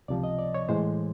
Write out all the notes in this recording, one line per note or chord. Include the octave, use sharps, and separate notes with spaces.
C#2 C3 F3 D5
D#5
D5
C#5
A2 E3 G#3 C5